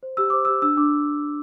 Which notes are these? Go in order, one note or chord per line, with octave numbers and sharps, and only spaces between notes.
C5
G4 E6
C5 D6
G4 E6
D4 E6
D4 D6